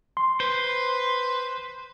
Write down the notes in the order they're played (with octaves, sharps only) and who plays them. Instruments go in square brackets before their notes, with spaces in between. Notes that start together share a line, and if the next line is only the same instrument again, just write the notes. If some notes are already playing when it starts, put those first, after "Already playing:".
[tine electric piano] C6
[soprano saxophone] B4 [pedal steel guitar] C5